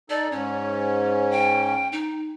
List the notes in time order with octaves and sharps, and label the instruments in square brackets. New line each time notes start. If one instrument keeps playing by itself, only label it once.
[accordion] D#4 A4 [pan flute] D5
[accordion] G#2 C#4 [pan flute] C#5
[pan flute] G5
D#4